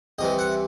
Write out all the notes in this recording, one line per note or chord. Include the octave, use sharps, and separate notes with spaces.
C2 C3 E3 D#5
F#5